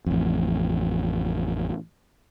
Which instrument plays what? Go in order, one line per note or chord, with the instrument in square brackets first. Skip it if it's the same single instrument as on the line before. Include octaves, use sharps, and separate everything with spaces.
[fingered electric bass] A1 F2